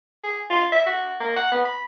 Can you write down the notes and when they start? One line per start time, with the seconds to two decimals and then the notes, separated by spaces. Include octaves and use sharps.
0.24 G#4
0.50 F4
0.72 E5
0.86 F#4
1.20 A#3
1.36 F#5
1.52 B3
1.65 B5